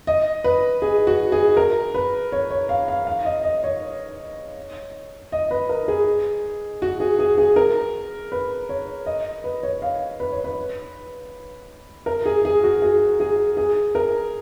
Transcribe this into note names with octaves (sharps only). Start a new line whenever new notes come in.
D#5
B4
G#4
F#4
G#4
A#4
B4
C#5
C#5
F5
F5
F5
D#5
D#5
C#5
D#5
B4
A#4
G#4
F#4
G#4
G#4
G#4
A#4
B4
C#5
D#5
B4
C#5
F5
B4
C#5
B4
A#4
G#4
G#4
F#4
G#4
G#4
G#4
A#4